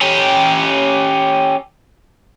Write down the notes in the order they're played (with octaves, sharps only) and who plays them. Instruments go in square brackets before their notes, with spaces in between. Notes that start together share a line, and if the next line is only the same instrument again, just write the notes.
[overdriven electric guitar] C#4 G4